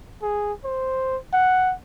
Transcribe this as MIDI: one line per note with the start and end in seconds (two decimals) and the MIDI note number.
0.22 0.53 68
0.64 1.17 72
1.33 1.74 78